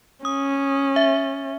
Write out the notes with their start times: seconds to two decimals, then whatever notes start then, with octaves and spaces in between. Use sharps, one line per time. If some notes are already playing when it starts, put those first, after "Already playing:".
0.25 C#4 D#6
0.96 E5